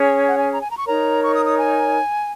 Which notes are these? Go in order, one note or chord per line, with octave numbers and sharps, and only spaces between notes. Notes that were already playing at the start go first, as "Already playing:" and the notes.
Already playing: C#4 G#4 C#5
F#5
G#5
A#5
G#5
A#5
C#6
D#4 A#4 C#5 A#5
C#6
D#6
D#6
G#5